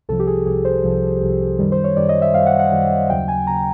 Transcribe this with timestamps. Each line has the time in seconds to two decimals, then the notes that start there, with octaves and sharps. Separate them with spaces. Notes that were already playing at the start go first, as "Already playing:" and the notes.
0.09 C2 C3 F3 A4
0.20 G4
0.27 G#4
0.46 C2 C3 F3 G#4
0.65 C5
0.84 C2 C3 F3
1.21 C2 C3 F3
1.59 F#2 D#3 G3
1.72 C5
1.84 C#5
1.96 F#2 D#3 G3 D5
2.09 D#5
2.22 E5
2.34 F#2 D#3 G3 F5
2.46 F#5
2.59 F#5
2.72 F#2 D#3 G3
3.10 D#2 C#3 F#3 G5
3.28 G#5
3.47 D#2 C#3 F#3 A#5